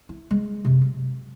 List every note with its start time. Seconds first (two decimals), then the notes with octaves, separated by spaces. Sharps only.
0.09 E4
0.31 G#3
0.65 F#2 C3
0.81 F#3